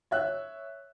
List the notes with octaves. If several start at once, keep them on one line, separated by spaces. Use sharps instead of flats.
C#5 E5 F#6